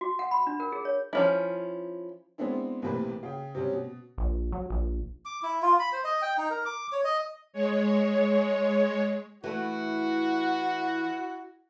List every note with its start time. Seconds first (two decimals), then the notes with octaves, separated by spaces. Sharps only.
0.01 F#4
0.19 F#5
0.31 B5
0.47 D4
0.60 A#4
0.72 G#4
0.85 C#5
1.13 F3 C#4 E4
2.38 G#3 B3 C4 D4 E4
2.82 B1 A2 C3 E3 A#3 B4
3.23 C#3 G5
3.55 C3 F#3 G3 C#4
3.73 B2
4.18 A#1
4.52 F#3
4.70 A#1
5.25 D6
5.43 E4
5.62 F4
5.79 B5
5.93 C5
6.04 D#5
6.22 G5
6.38 D#4
6.50 A#4
6.65 D6
6.92 C#5
7.04 D#5
7.53 G#3 C#5
9.44 E3 A3 E4 F#4